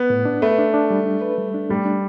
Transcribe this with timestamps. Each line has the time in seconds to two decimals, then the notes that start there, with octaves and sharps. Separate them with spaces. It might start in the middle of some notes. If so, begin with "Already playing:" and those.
Already playing: B3
0.10 A2
0.25 D4
0.42 A3 B4
0.59 D4
0.74 D4
0.90 G3
1.06 D4
1.22 B4
1.38 G3
1.54 D4
1.69 G3 A3
1.85 D4